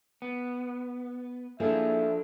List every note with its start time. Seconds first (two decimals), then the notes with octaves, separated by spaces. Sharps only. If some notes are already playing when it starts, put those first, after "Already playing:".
0.22 B3
1.60 F3 A#3 D4 E4 G#4 A4 E5